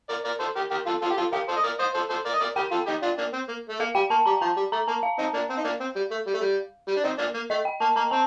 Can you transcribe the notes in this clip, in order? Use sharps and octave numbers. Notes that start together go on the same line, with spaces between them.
A#4 D5
A#4 D5
A4 C5
G4 A#4
G4 A#4
F4 A4
F4 A4
G4
F4 A4
G4 A#4 F5
A4 C5
D#5
A#4 D5
C5 D#5
A4 C5
A4 C5
A#4 D5
D#5
A#4 D5
G4 A#4 G5
F4 A4
D#4 G4
D4 F4
A#3 D4
C4
A#3
A3
A#3 F5
G3 G5
A#3 A5
G3 A#5
F3 A5
G3
A3 A#5
A#3 A5
F5
C4 D#4
A#3 D4
C4
D#4
A#3 D4
C4
G3
A3
G3
A3
G3
G3
D4
C4 D#4
A#3 D4
A#3
A3 D#5
G5
A#3 A5
A#3 A#5
C4 A5